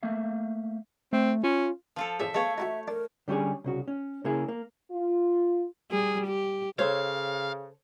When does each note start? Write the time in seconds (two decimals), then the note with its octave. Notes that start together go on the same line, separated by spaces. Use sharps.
0.03 A3 A#3 E5 F5
1.13 A3 C4
1.44 C#4 F4
1.96 F3 F4 A4
2.20 A1 C#4 G#4 E5
2.34 A3 B3 G#4 C#5 D#5 F5
2.58 D#4 E4 F#4 E5
2.88 D4 A#4
3.28 D3 G3 C#4 G4 G#4
3.64 C2 C#3 F#4
3.88 C#4
4.25 C#3 A#3 E4 G#4
4.48 A#3
4.92 F4
5.91 G3 G#4
6.27 G4
6.79 C#3 A4 C5 C#5 F5